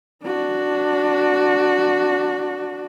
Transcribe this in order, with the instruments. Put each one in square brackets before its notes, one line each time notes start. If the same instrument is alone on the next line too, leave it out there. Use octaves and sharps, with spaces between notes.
[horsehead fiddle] D4 F#4